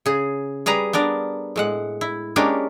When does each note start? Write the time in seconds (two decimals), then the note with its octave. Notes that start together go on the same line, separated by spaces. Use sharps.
0.06 C#3 G#4
0.66 G3 G#4 B4 A#5
0.93 B3 D4 A#4 D5
1.56 A2 G#3 F#5
2.01 E4
2.36 G#3 A#3 C#4 D4 G4 A#4